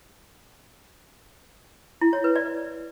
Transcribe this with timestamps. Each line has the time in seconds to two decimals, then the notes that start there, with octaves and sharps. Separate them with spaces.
2.01 E4
2.13 C#5
2.24 B4
2.36 D5